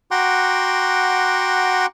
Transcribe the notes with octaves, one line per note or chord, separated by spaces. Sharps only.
F#4 F#5 G5 A#5 C6 D6